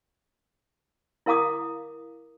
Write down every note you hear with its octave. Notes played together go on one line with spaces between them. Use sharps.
E4 A#4 F5 A#5 D6 D#6